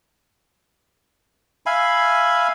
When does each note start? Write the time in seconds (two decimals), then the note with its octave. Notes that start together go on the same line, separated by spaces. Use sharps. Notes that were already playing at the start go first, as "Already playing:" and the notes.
1.66 E5 F5 G#5 B5